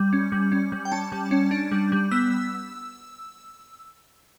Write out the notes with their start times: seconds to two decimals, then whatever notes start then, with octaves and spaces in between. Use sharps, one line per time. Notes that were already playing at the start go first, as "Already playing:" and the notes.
Already playing: G3
0.13 C#4
0.32 G3
0.52 C#4
0.72 G3
0.85 G5
0.91 C#4 A5
1.12 G3
1.31 C#4
1.51 D4
1.71 G3
1.92 G3
2.11 B3 E6